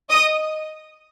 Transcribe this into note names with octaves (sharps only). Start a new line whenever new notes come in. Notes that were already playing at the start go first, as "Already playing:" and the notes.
D#5 D#6